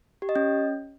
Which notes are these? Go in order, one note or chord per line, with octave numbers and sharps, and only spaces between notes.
G4
D#5
C#4